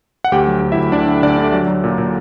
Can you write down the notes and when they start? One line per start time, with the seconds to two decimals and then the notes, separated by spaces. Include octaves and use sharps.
0.24 F#5
0.32 D2 G4 G5
0.47 F#3
0.62 D2
0.72 E4 E5
0.77 D2
0.92 D2 D4 D5
1.07 D3
1.23 D2 D4 D5
1.38 D3
1.53 F#3
1.68 F#3
1.84 A#2
1.98 A#2